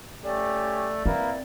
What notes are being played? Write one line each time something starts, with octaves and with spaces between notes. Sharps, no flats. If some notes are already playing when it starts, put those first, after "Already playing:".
A3 C#4 G4 D5
A#3 C4 E4 B4